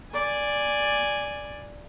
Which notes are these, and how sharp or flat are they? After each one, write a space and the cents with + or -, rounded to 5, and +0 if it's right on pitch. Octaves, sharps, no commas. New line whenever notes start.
D5 +0 G#5 -5